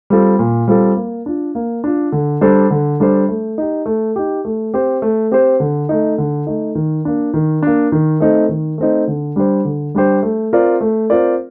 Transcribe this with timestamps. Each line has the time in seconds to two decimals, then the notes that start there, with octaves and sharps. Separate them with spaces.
0.10 G3 C4 F4 A4
0.39 A#2
0.68 G3 C4 F4 A4
0.96 A#3
1.26 D4 F4
1.55 A#3
1.84 D4 F4
2.12 D3
2.41 G3 D4 A4 C5
2.71 D3
3.00 G3 D4 A4 C5
3.28 A3
3.58 D#4 G4
3.86 A3
4.16 D#4 G4
4.45 A3
4.74 C4 G4 C5
5.02 A3
5.31 C4 G4 C5
5.60 D3
5.89 A3 D#4
6.18 D3
6.47 A3 D#4
6.75 D#3
7.05 A#3 D4
7.34 D#3
7.63 A#3 D4
7.92 D#3
8.20 A3 C4 D#4
8.49 D#3
8.78 A3 C4 D#4
9.07 D3
9.36 G3 D4 G4 C5
9.65 D3
9.95 G3 D4 G4 C5
10.23 A3
10.53 C4 F4 A#4 D5
10.81 A3
11.10 C4 F4 A#4 D5